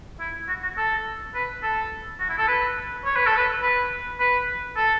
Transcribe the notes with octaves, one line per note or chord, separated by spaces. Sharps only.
E4
F#4
F#4
A4
B4
A4
F#4
E4
A4
B4
C#5
B4
A4
B4
B4
B4
A4